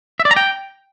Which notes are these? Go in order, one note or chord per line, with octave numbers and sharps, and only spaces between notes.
E5
D5
A#5
G5